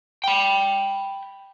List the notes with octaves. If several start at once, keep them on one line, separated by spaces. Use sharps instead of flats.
G5 B5